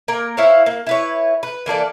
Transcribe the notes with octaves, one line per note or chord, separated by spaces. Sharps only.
A#3 A#4
E4 C5 C#5 F5
A#3
E4 B4 C#5
B4
E3 A#3 A4 D5